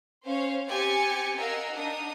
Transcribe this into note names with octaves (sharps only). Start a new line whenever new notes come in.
C#4 C5 C#5 F5
C4 G4 G#5 A6 C#7
A#4 D#5 F5 F#5 E6
D4 D#4 D#6